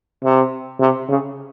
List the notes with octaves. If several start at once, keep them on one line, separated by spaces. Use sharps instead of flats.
C3
C3
C#3